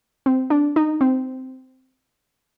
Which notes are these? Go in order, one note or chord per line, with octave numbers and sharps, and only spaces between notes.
C4
D4
D#4
C4